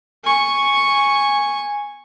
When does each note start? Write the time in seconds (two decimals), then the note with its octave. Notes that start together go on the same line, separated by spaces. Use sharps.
0.24 G#5 C#6